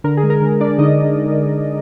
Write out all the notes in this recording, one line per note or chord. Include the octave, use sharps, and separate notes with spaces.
D3 A#4
G#4
G#3
A#4
D3
D3 D4 D5
D3 D#4 D#5